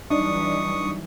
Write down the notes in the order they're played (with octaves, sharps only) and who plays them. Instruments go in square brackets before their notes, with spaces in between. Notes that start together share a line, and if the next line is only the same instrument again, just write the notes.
[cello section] E3 F#3 G3 [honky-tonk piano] D4 D#4 [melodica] C#6 D#6